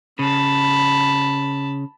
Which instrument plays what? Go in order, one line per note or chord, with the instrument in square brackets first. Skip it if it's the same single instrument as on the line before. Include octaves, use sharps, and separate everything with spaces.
[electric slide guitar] C#3 [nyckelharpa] A5 B5